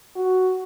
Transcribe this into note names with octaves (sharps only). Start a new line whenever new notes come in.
F#4